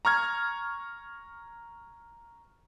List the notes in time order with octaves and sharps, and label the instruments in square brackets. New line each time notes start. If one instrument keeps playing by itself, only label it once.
[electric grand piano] A#5 C#6 F6 G#6